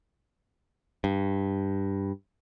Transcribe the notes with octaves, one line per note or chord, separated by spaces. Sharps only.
G2